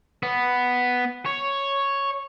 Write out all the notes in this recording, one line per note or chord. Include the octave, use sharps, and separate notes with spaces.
B3
C#5